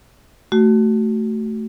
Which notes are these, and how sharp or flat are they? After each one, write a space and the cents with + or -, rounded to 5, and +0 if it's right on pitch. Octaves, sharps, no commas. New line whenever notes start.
A3 +0 F#4 +20